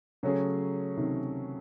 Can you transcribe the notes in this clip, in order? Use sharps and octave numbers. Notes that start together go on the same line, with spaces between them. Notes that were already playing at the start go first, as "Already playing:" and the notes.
C#3 F#3 A3 C#4 G#4
C3 D#3